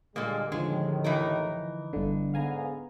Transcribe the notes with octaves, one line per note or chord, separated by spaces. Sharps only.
A#2 D3 G3 G#3 A#3 D#5
D#2 A2 D3 D#3 F3 G#3
E3 D#4 A#4
G1 D3
G#2 D3 B3 F5 G#5 A#5